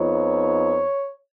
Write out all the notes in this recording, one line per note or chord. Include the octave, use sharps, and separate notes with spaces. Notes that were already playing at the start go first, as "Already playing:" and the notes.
Already playing: F2 F3 B3 D#4 C#5